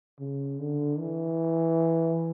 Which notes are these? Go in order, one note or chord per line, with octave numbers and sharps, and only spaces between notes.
C#3
D3
E3